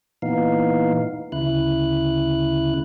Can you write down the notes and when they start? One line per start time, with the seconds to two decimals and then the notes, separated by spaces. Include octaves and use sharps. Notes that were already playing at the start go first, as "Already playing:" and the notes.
0.22 A#2 E3 B3 D#4 F5
1.32 D2 C#3 E4 F#6